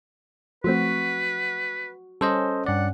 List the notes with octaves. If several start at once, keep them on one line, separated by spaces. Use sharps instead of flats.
F3 A3 C4 F#4 B4
G3 C#4 A4 C5 D#5
G2 D5 F#5